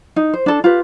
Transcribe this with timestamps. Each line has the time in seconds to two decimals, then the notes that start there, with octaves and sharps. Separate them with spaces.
0.16 D#4
0.34 C5
0.46 D4 A4
0.64 F4 G4 B4